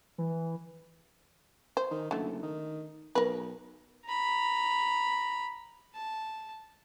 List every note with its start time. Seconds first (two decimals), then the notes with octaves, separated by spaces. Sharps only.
0.18 E3
1.77 C5
1.91 D#3
2.11 F#1 D3 A3
2.43 D#3
3.15 B1 A#4 B4
4.06 A#5 B5
5.95 A5